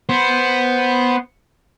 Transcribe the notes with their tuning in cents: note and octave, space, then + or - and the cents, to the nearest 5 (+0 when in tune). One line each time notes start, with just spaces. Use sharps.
B3 +0 C5 +0